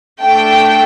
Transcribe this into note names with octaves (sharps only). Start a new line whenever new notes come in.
A3 D4 A4 G5